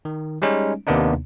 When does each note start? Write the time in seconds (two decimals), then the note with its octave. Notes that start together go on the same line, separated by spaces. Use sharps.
0.05 D#3
0.42 G3 G#3 C#4 D#4
0.87 D#2 C3 A#3 B3 D4 D#4